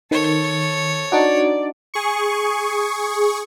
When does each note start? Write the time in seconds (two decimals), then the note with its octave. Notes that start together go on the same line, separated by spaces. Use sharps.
0.11 D#3 A4 C#5
1.12 D4 D#4 F#4 D5
1.94 G#4 C#6